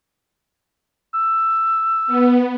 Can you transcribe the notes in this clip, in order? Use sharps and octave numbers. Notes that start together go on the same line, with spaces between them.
E6
B3